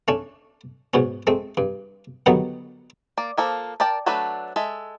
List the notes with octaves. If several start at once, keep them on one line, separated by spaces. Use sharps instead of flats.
A3 C#4 D4
G#2 B2 C#4
G#3 A3 C4
G2
D3 D#3 F#3 G3 B3 D#4
A#3 D5
F3 A#3 A4
A#4 D5 G5 A5
F#3 A3 D4 A4 B4
G#3 A4 E5